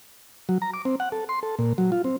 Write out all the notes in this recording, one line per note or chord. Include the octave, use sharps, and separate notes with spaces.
F#3
A#5
D6
C4
F#5
A4
C6
A4
A#2
F#3
F4
C4